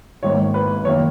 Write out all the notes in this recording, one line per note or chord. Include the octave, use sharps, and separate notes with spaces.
G#1 G#2 D#3 A#3 C#5
B4
F#2 D#3 A#3 C#5